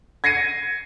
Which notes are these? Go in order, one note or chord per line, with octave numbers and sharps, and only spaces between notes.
G#6 A#6 C7 C#7 D#7